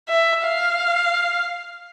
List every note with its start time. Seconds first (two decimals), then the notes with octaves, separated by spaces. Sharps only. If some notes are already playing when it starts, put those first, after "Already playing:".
0.09 E5
0.44 F5